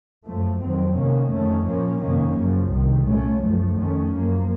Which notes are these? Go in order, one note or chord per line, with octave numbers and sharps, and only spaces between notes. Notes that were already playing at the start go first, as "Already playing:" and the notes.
F#2 F3 A3
F2 D#3 F#3 C4
C3 D#3 A#3 C#4
F2 D#3 A3 C#4
A#2 F3 A#3 C#4
F2 C3 D#3 A#3 C#4
F#2 C#3 F3
C2 C3 D#3
A#2 A3 C#4
F#2 F3 A3
F2 D#3 A3 C#4
F#2 F3 A#3